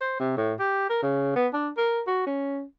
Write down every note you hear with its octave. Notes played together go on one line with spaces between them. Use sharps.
C5
C3
A2
G4
A#4
C#3
B3
D4
A#4
F#4
C#4